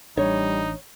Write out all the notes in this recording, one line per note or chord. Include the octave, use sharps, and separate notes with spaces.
A1 G3 D4 D#4 C#5